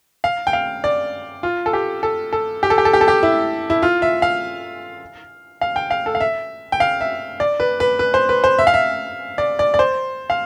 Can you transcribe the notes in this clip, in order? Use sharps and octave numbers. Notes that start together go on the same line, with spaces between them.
F5
G5
F5
D5
F4
A4
G4
A4
A4
G4
A4
G4
A4
G4
A4
G4
E4
E4
F4
E5
F5
F5
G5
F5
A4
F5
E5
G5
F5
E5
D5
B4
B4
B4
C5
B4
C5
E5
F5
E5
D5
D5
D5
C5
F5